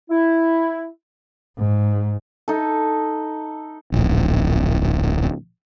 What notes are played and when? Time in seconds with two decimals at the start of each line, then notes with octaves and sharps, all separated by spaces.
0.09 E4
1.58 G#2
2.48 D#4 A4
3.92 D1 A#1